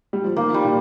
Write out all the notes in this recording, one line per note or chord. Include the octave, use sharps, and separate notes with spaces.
G3
F3
D#3 A#3
G3
A#2